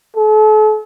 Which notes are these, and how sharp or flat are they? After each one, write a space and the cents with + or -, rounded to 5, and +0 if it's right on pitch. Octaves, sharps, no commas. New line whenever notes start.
A4 -40